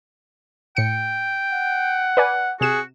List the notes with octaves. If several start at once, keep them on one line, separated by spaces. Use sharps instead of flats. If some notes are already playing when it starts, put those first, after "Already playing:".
A2 G5 C#7
F#5
B4 D5 G#5
C3 F#4 G#4 E7